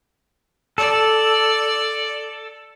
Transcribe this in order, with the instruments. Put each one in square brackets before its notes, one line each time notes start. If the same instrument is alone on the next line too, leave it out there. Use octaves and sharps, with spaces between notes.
[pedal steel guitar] A4 [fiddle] D5